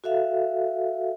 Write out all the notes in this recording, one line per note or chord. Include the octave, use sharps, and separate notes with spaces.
F#4 A4 E5 F5